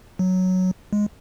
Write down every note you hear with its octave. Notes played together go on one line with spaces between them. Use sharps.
F#3
G#3